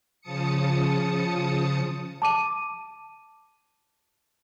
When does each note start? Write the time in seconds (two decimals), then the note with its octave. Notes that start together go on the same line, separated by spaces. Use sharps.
0.21 C#3 F3 A5 D#6 C#7
2.22 A5 D6 D#7